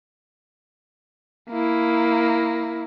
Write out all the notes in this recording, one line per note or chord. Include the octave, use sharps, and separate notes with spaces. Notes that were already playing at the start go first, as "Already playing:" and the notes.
A#3 E4